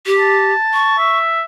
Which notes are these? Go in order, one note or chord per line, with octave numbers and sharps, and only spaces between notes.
G4
A5
C#6
E5